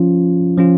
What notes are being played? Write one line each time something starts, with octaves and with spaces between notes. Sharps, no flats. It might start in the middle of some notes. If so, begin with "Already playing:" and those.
Already playing: F3 C#4 F4
F3 C#4 F4